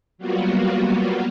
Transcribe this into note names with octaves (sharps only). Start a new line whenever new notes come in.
F#3 G3 A#3 B3 F4 F#4